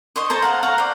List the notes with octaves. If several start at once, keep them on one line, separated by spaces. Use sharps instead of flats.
C5 D#5 C6 C#6
A4 C5 A5 A#5
F5 F#5 A#5
C#5 F5 F#5 A#5
C5 D5